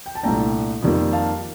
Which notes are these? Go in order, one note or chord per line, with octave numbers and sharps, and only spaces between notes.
G5
A5
C2 A#2 A3 D4 G5 A#5
F2 D#3 G3 A#3
F5 A5